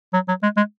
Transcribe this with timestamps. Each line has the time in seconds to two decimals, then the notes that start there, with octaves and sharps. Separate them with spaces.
0.14 F#3
0.28 F#3
0.43 G#3
0.57 G#3